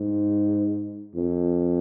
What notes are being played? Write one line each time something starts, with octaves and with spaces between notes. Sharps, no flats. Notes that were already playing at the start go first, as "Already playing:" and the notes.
Already playing: G#2
F2